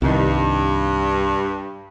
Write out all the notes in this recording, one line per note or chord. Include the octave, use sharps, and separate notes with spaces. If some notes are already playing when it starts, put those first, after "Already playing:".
C2 G2 D#3